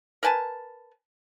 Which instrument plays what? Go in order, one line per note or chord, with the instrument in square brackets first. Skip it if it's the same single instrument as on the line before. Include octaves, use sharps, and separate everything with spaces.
[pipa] A#4 B4 G#5 A5